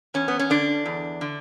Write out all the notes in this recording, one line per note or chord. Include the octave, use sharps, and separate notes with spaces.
E2 C#4
B3
C#4
D3 D4
E2
D3